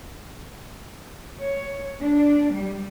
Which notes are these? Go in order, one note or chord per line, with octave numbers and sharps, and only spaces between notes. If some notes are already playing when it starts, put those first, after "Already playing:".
C#5
D4
G3